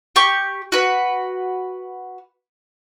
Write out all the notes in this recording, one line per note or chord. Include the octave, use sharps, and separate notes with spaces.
G4 C#6
F#4 B4